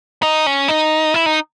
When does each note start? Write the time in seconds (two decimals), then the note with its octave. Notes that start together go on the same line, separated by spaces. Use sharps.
0.23 D#4
0.46 C#4
0.68 D#4
1.14 E4
1.26 D#4